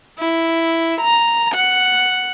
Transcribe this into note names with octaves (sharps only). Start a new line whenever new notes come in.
E4
A#5
F#5